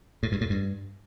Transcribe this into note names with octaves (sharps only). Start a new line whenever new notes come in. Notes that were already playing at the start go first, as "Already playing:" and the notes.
A2
G2
A2
G2